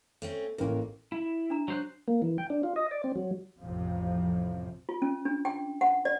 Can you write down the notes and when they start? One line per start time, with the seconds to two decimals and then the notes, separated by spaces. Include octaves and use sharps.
0.22 A3 C4 C#4
0.58 A1 F2 A#3 A#4
1.12 E4
1.50 D4 A#5
1.68 F#3 C5 F#6
2.08 A#3
2.22 E3
2.38 G5
2.50 D4
2.63 F4
2.76 D#5
2.91 D5
3.04 C4
3.16 F#3
3.61 A1 F2 C3 F3
4.89 F4
5.02 C#4
5.25 D4
5.45 G5
5.81 F#5
6.05 D5